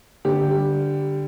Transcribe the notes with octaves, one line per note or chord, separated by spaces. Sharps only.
D3 G4
G3